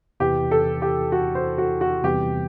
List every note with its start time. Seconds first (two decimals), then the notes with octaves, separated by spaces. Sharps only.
0.20 E2 C3 E3 G4
0.51 A4
0.82 G4
1.12 F#4
1.35 C5
1.58 F#4
1.81 F#4
2.03 E2 C3 E3 G3 C4 G4